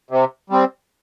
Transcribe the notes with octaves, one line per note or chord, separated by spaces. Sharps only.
C3
G3 C4